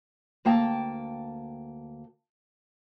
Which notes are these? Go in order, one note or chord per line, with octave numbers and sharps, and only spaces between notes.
D2 A#3 G5 A5